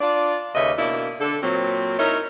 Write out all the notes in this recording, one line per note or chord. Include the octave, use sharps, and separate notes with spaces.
D4 F4 D5
D#2 C#3 B4 D#5 E5
B2 A#3 D4 E4
D3 A4
A#2 F#3 C4
D#4 E4 A#4 C#5